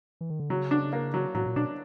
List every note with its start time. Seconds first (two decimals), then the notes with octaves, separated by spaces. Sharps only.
0.21 E3
0.30 D#3
0.40 D3
0.50 C#3 F#3
0.71 D4
0.93 A#3
1.14 F#3
1.35 A2 F#3
1.46 A#2
1.56 B2 D4